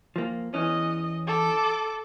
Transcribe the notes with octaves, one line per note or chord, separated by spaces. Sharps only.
F3 A#3
E2 E3 C#4 D#5
A4 D6